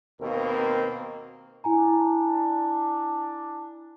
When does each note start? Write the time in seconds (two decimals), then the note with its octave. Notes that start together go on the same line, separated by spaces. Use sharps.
0.21 D#2 B2 A#3 C4 A#4
1.64 D4 E4 G#5 A#5